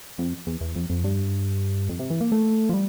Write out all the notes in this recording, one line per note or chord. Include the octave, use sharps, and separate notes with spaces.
F2
E2
E2
F2
F2
G2
F2
C3
E3
A#3
A3
F3
G3